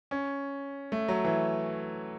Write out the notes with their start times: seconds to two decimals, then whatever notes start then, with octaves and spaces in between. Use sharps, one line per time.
0.11 C#4
0.92 A3
1.08 F#3
1.25 E3